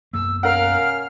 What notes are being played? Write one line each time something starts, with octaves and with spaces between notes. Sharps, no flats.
B1 F#2 A#3 E6
C#4 A#4 F5 F#5 F6